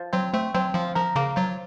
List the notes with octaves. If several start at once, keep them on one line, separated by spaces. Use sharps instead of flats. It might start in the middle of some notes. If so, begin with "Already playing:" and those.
Already playing: F3
F#3 C4
A3 C4
F#3 C4
F3 F4
F3 A#4
C#3 A#3
F3 F#3